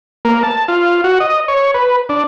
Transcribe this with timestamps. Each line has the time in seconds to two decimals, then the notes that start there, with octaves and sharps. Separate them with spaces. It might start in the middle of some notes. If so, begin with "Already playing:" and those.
0.25 A#3
0.43 A5
0.68 F4
1.04 F#4
1.20 D#5
1.48 C#5
1.74 B4
2.09 D4